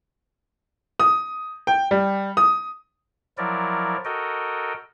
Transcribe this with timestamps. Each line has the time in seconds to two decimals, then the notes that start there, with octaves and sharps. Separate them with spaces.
1.00 D#6
1.67 G5
1.91 G3
2.37 D#6
3.38 F3 F#3 E4 A#4 D5
4.05 F#4 A4 A#4 D#5 G5